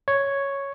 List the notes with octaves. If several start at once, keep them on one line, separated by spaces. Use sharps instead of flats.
C#5